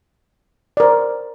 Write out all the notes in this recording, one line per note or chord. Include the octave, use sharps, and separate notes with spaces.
A#4 C5 D5